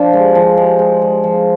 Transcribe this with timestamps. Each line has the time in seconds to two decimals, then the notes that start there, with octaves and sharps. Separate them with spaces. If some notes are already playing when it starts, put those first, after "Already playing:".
Already playing: F3 D4
0.13 G#3
0.35 F3
0.57 G#3
0.79 G#3
1.02 G#3
1.24 F3